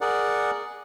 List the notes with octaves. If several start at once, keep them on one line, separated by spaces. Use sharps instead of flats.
G#4 A#4 D5 F#5